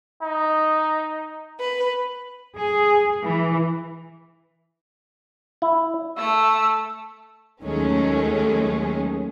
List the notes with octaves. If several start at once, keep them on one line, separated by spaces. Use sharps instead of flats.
D#4
B4
G#4
E3
E4
A3 E6
D#2 D#3 F#3 G#3 A3 C#4